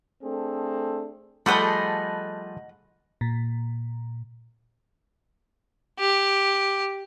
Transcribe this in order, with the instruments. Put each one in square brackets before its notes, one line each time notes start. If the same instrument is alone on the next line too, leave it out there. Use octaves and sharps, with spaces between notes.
[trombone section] A3 C4 D4 G#4 A4
[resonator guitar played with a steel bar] F3 G#4 A4 [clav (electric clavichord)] G3 A3 [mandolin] D#5 F#5 B5
[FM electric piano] A#2
[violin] G4